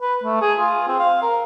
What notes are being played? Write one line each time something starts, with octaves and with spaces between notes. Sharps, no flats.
B4
A3
G#4
F4
C4
F5
A#4